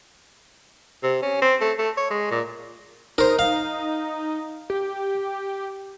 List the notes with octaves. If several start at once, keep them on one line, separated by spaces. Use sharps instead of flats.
C3
C#4
C4
A3
A3
C#5
G#3
A#2
D#4 A#4 C5
F5
G4